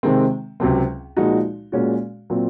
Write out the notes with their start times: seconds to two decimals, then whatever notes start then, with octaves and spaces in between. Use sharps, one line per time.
0.03 C3 D#3 G#3 C4
0.60 C#2 C3 F#3 C4
1.17 A#2 F3 G#3 D#4 F#4
1.72 A#2 G#3 C#4 F#4
2.30 A#2 F#3 C4